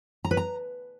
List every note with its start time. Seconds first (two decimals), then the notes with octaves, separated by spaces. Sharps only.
0.25 A#5
0.31 B4
0.37 A#5